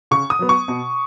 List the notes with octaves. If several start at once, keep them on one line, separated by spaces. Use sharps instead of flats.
C#3 C#6
D#6
F#3 B3
C#6
B2